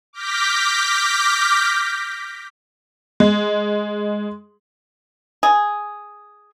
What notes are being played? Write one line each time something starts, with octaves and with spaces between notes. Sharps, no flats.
D6 F6 G6 A#6 B6
G#3
G#4